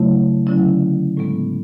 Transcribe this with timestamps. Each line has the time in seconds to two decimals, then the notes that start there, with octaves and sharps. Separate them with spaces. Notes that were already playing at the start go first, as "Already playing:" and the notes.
Already playing: C#3 F#3 A3 E4
0.47 D3 F#3 C#4 E4
1.17 A2 G#3 B3